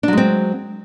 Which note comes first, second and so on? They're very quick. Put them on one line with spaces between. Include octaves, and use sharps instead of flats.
D4 F#3 G#3 C4